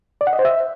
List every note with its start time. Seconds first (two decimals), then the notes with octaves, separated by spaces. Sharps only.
0.21 D5
0.27 F#5
0.33 D#5
0.39 C5
0.45 E5